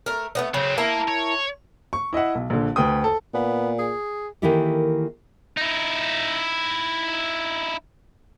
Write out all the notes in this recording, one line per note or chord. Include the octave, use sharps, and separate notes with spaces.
A3 A#4
A3 B3 D#4
C#3 F#3 C4
A#3 E4 A#4 A5
C#5
C#6
E4 D#5 E5 F#5
B1
A#1 D3
D2 B4 G5 D#6
A4
A#2 B3
G#4
D#3 E3 A#3 E4 G4 A4
D#4 E4